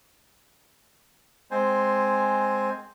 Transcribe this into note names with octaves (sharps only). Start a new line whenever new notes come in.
G#3 C4 C5 G#5